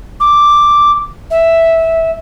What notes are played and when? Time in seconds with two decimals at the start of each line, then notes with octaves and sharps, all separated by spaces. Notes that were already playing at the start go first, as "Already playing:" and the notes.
0.20 D6
1.31 E5